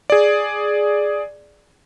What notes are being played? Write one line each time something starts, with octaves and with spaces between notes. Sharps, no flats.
G#4 D5